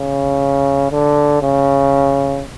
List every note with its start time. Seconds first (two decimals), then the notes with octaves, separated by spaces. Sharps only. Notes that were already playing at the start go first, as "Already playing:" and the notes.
Already playing: C#3
0.91 D3
1.41 C#3